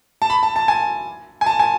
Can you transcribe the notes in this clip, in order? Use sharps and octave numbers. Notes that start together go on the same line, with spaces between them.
A5
B5
A5
A5
G#5
G#5
A5
G#5